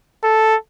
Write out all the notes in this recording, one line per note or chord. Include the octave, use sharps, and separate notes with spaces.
A4